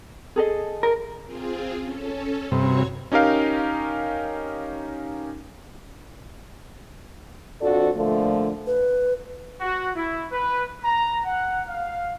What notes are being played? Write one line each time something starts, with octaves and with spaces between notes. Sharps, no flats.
G#4 A4 D#5
A#4
C4 F4 G#4
C#4 A4
G2 C3 F#4 C#5 C#6
C#4 D#4 G4 A#4 F5
F2 F3 D4 F#4 A4 D5
A#2 D3 F3 A3
B4
F#4
E4
B4
A#5
F#5
F5